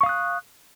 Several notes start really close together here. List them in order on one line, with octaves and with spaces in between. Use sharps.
C#6 F5 D#6 F#6